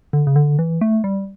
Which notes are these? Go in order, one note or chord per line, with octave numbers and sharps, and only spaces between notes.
D3
C#3
D3
E3
A3
G3